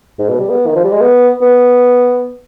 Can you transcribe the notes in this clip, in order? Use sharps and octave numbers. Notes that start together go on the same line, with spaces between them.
G#2
B2
G3
B3
D#3
F3
G3
G#3
B3
B3